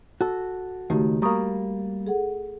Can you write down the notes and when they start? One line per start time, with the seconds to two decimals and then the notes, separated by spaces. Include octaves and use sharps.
0.21 F#4 A4
0.90 C#2 D#3 A3 F#4 G4
1.22 G3 A#3 A#5 C#6 D#6
2.07 G#4 A4 F#5